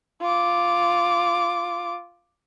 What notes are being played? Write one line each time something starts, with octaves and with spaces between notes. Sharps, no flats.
F4 D6